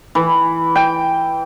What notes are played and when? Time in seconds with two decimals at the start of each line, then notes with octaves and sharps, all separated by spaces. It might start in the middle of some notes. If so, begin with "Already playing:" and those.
0.15 E3
0.76 G5